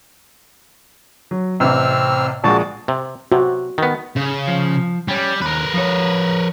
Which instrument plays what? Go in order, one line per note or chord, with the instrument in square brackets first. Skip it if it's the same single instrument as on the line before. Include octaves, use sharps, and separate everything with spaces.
[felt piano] F#3
[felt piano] A1 C3 [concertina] C4 E6 F6
[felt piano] A#1 G#3 [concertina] F#4 A5
[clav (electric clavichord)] C3
[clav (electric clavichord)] C3 [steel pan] F#4
[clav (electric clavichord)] D#3 B3
[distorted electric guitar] C#3
[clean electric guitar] F3
[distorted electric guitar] G3 [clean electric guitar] C#4 G4
[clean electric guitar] D#2 [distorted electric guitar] A#4 B4
[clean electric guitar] F3 C#5